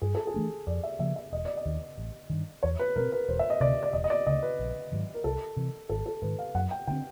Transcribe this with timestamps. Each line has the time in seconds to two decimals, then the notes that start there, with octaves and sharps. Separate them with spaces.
0.02 G2 G#4
0.15 A4
0.27 G#4
0.34 E3 A3 D4
0.67 F2 D5
0.83 E5
0.99 C#3 F3 A#3 E5
1.16 E5
1.32 E1 D#5
1.45 D5
1.57 D#5
1.65 D#2 D#3
1.98 A1
2.30 G2 D#3
2.63 E2 C#5
2.79 B4
2.96 B2 G#3 C4 A#4
3.12 B4
3.29 E1 C5
3.39 E5
3.50 D#5
3.60 D2 C3 D5
3.83 D5
3.93 E1 D#5
4.04 D#5
4.10 D5
4.27 D2 C#3 D#5
4.43 B4
4.59 A#1
4.92 G#2 D#3 F#3
5.14 A#4
5.24 C2 A4
5.57 C3 E3
5.89 G#1 A4
6.06 A4
6.22 G#2 D#3 B4
6.39 F5
6.55 F#2 F#5
6.71 G5
6.87 D3 G3 C4 G5